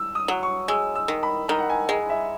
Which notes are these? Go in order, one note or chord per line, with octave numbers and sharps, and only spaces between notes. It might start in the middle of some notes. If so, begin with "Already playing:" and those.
Already playing: E6
D#6
F#3
C#6
G#3 E6
E6
D#3
B5
D#3 A#5
F#5
G#5
G#3 G#5
E5